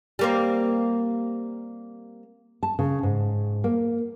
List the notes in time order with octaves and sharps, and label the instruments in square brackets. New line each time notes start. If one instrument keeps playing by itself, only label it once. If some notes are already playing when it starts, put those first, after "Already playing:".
[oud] G3 A#3 C4
[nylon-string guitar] A5
C#3
G#2
A#3